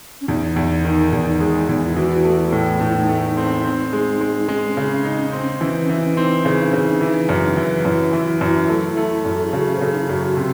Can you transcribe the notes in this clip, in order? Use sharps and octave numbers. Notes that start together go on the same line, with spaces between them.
C#4
E2 D#4
E2
D#3
E2
G#3
E2
E4
E3 F#4
A3
E4
A2
A2 D#4
E4
D#4
A3
C4
C4
G#3
G#3
D#4
G#3 C#4
C#3
D#4
C4
E3
E3
C4 D#4
C#3
C#3
E3
F#2
E3
F#2 E4
E3
F#2
A3
A3
F#2
A4
G#4
C#3 F#4
C5
C#3 A4
D#4
E4
F#2 F#4
C3 C#4